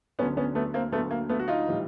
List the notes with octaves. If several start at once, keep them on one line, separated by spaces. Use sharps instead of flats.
D2 D3 F#3 B3 C#4
B3 C#4
A3 B3
A#3 C4
D2 D3 F#3 A3 B3
A#3
A3 B3
F#4
D#4 F4
A2 E3 G3